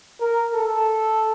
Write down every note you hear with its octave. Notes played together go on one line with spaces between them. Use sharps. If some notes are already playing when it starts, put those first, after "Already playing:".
A#4
A4